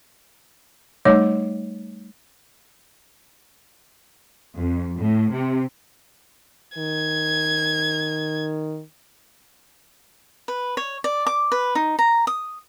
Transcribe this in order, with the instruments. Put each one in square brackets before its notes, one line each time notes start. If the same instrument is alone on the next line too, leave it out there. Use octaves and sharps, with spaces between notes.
[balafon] G3 A3 D#4 C#5 D6
[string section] F2
A2
C3
[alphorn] D#3 [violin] G#6
[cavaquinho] B4
C#5
D5
D6
B4
D#4
A#5
D#6